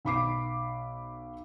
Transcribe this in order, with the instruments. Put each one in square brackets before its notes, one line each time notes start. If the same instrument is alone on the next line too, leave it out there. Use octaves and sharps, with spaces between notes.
[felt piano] B1 B5 D6 C7